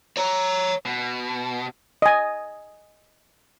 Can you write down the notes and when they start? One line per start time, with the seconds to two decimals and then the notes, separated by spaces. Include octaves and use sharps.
0.17 C#5 A#5
0.85 B2
2.02 D#5 G#5